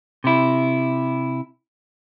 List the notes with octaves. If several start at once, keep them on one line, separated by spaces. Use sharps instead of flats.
C3 E4